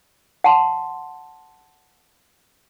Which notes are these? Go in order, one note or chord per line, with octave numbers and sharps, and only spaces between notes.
F#5 A5 C6